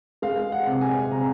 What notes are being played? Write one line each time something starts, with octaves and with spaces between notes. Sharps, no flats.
G#3 F5
F#5
C3
G#5
C3 A#5